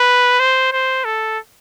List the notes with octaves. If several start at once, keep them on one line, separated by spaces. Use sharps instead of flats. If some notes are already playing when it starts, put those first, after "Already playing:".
Already playing: B4
C5
C5
A4